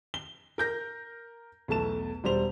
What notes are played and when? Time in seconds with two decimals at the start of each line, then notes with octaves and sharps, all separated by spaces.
0.14 G7
0.58 A#4 G6 A#6
1.68 B1 E2 A3 A5 E7
2.24 E1 G3 C5 F7